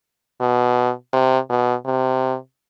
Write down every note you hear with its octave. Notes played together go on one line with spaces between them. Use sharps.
B2
C3
B2
C3